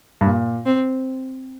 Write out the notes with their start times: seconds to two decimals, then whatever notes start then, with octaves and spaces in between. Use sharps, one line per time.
0.21 G2
0.26 A#2
0.66 C4